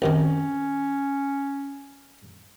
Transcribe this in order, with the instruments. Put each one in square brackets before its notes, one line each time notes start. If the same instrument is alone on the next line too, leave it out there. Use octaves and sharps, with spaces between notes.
[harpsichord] C2 F#2 D#3 [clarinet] C#4